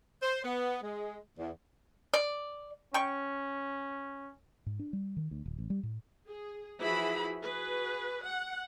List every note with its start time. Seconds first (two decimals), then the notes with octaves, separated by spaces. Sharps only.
0.22 C5
0.44 B3
0.82 G#3
1.38 E2
2.14 D5
2.94 C#4 G5 C#6
4.66 G#2
4.79 D4
4.93 G3
5.17 D#3
5.31 D2
5.46 D1
5.58 A1
5.70 G3
5.83 A2
6.27 G#4
6.81 E3 F3 E4 F#4 G#4 B5
7.43 F#4 G#4 B4
8.24 F#5